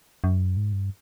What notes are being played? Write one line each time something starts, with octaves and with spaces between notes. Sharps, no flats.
F#2
G#2
G2